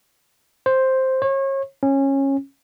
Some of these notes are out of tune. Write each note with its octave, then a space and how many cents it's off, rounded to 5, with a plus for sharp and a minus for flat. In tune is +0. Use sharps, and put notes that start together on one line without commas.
C5 +5
C#5 -35
C#4 -20